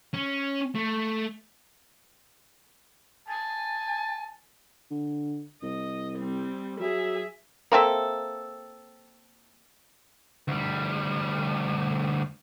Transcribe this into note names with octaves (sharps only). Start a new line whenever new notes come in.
C#4
A3
G#5 A5
D3
C2 D#5
G3 C4
F#3 G#4 E5
A#3 C4 A4 E5
D2 G3